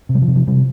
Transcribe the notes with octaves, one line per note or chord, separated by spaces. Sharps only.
C3
G3
F3
C3
F3
C3 G3